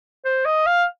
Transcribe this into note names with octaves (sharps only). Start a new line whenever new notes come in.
C5
D#5
F5